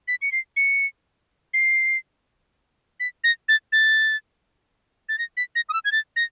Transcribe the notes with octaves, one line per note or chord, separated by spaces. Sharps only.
B6
C#7
C7
C#7
C7
B6
A#6
A6
A6
A6
A#6
B6
A#6
D#6
E6
G#6
A6
A#6